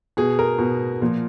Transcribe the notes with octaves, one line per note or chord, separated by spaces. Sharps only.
B2 G#4
A#4
B2
A#2 F3